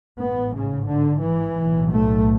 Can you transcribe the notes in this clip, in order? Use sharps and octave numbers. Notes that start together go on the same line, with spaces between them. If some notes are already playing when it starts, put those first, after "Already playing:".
A1 G#2 B3
C#3
D3
E3
B1 A2
A3